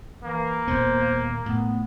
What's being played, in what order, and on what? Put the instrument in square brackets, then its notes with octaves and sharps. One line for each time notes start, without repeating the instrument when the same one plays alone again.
[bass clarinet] E3 [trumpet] A#3
[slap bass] D#1 A#2 B3 [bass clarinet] C5
[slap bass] A2 [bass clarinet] B3